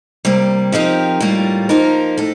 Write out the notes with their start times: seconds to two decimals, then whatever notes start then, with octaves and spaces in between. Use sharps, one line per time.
0.25 C3 G3 A#3
0.72 F3 C4 D#4 G4 A#4
1.20 A2 G3 A#3 F4
1.69 F3 A#3 D#4 A#4
2.17 A2 A4